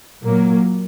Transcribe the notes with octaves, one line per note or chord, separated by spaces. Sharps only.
A#2 F#3 A#3